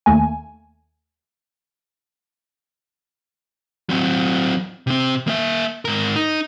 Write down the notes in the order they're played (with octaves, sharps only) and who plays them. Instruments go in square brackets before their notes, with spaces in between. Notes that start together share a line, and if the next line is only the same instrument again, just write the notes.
[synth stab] D#2 A3 A#3 G#5
[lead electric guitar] F#3 C4
C3 C4
A#3 E5
G#2 A#4
D#4